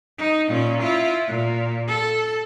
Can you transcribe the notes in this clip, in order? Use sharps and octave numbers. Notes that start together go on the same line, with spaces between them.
D#4
A#2 C#4
E4 F4
A#2
A4